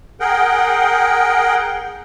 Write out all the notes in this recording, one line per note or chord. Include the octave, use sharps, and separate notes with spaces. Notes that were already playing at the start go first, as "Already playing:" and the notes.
G#4 A#4 F#5 G5